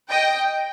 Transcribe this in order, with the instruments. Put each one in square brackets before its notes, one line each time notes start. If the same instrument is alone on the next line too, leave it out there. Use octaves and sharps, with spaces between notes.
[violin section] D#5 G5